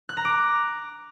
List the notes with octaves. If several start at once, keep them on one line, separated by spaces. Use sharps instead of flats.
F#6
A#5
D6